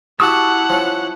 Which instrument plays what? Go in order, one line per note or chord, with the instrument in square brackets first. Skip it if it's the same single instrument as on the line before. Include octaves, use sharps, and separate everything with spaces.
[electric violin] E4 F#5 [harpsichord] F#4 G4 [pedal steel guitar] A5 C#6 E6
[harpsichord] F3 C#4